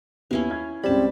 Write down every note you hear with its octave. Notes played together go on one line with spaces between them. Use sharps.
D#2 B3 C#4 E4 F5
G#6
C#2 G3 C4 C5 A5 B5